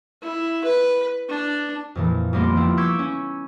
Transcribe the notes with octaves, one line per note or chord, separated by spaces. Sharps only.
E4
B4
D4
F2 A#2 E3
F2 G3 A#3 B3 C6 D6
F3 G3 C4 E4 F4
C#6 D6 E6 G6 G#6 B6
C#4